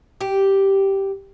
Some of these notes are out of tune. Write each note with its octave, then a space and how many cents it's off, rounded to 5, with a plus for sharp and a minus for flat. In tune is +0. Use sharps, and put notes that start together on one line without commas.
G4 -5